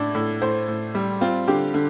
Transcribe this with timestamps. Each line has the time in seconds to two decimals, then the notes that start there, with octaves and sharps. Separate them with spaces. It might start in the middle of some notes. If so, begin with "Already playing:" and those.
Already playing: A2 D4
0.15 A2
0.42 A2 C5
0.68 A2
0.95 G3
1.21 C4 F4
1.48 D3 G4
1.74 D3